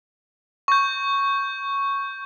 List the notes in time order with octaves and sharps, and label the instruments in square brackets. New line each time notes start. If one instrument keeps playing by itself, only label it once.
[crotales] C#6 G6